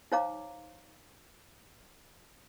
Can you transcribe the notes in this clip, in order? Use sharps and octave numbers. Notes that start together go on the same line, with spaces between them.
D#4 C5 C#5 F5 A#5 D6